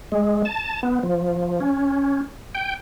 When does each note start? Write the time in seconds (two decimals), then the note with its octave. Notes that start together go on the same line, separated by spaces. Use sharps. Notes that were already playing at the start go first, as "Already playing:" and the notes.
0.12 G#3
0.45 A5
0.83 B3
1.03 F3
1.60 C#4
2.55 G5